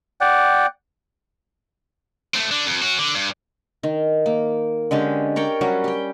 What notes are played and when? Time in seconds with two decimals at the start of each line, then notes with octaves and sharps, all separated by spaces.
0.21 D5 F#5 G5
2.34 A3 C4
2.51 D3 D4
2.66 F2
2.82 C#4 F#4
2.99 D3
3.15 G2
3.83 D#3
4.26 A#3
4.91 D3 G#3 C#4 G4
5.36 A#4 C#5 D5 G5
5.61 F#3 G3 C#4 F#4
5.84 G4 G5